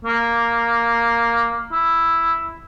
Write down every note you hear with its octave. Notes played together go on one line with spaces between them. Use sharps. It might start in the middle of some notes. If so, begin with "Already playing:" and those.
A#3
E4